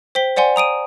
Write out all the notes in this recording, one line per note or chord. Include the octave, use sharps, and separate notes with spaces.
C5 G5 B6 G7
C5 D5 F#5 G#5 C6
A#5 D#6 D7 D#7